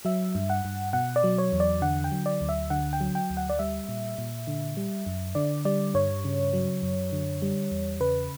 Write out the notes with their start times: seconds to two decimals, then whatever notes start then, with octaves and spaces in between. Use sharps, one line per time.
0.05 F#3 E5
0.35 G2
0.50 F#5
0.65 G2
0.93 B2 F#5
1.16 D5
1.24 F#3
1.38 C#5
1.52 E2
1.60 D5
1.82 D3 F#5
2.04 G5
2.12 F#3
2.26 D5
2.41 D2
2.49 E5
2.70 D3 F#5
2.93 G5
3.01 F#3
3.15 G5
3.30 D2
3.37 F#5
3.49 D5
3.59 G3 E5
3.89 A#2
4.18 A#2
4.47 D3
4.77 G3
5.06 F#2
5.35 D3 D5
5.65 G3 D5
5.94 G2 C#5
6.25 C#3
6.53 F#3
6.83 F#2
7.12 D3
7.42 G3
7.71 E2
8.00 C#3 B4